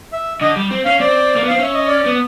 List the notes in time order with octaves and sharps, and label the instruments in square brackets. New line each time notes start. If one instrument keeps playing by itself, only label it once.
[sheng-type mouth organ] E5
[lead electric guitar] D3 [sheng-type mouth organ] D#5
[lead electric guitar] G3
C4
[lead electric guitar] C#4 [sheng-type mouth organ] F5
[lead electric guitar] C4 [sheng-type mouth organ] D5
[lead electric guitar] A#3
B3
[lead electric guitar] C4 [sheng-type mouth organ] F5
[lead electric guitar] C#4 [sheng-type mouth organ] E5
[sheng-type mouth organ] D#5
D5
[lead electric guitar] B3